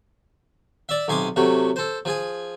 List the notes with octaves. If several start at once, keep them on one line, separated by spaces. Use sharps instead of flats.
D5 E5
B1 C3 G#5 C6 D6 D#6
C3 F#3 A3
A4 C5
F3 G#4 G#5